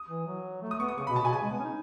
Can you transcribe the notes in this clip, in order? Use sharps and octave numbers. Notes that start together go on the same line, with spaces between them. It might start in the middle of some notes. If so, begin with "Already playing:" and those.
Already playing: D#6
E3
F#3
A3
D#6
B3 C#6
D#6
C#3 C#6
B5
B2
A5
B2 G#5
C#3 G#5
G#3
B3
C#4
D#4